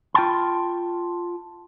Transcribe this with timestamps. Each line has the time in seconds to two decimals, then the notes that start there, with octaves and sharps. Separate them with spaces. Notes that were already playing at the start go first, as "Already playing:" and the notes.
0.15 F4 G5 A5 B5